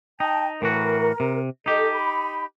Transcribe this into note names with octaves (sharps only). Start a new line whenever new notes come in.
D#4 G5 A5
A2 E3 F#4 A#4
C3
D#4 G4 A4 D#5
B5